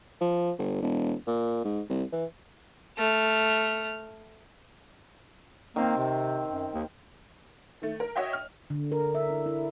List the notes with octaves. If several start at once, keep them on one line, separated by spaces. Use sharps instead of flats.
F3
G1
E1
A#2
G#2
C2
E3
A3 F6
D#3 A#3 C4
C3
F#2
D#2
D#3 A3
A#4
F#4 C#5 D#5 E5 G5
F6
D3
A#4
E5
E4
E4